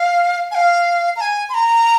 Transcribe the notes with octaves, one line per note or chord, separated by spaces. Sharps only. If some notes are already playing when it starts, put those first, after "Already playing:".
Already playing: F5
G#5
F5
A#5
G#5
C6
A#5